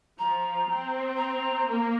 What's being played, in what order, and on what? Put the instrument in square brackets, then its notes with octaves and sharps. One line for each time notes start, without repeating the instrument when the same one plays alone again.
[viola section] F3 [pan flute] A#5
[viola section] C4
[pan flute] A#5
[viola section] A#3